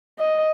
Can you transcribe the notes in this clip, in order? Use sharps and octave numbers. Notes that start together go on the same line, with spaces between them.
D#5